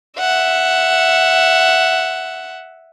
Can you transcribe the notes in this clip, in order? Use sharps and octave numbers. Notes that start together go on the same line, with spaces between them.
E5 F#5